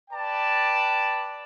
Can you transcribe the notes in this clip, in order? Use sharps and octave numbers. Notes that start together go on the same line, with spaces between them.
B4 D5 G5 A5